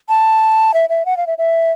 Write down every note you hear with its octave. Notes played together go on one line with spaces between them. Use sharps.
A5
E5
E5
F#5
F5
E5
E5